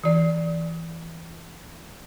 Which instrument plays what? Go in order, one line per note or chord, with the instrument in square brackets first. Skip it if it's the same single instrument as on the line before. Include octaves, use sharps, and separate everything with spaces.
[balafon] E3 D5